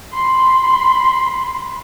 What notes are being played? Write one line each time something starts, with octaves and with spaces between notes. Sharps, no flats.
B5 C6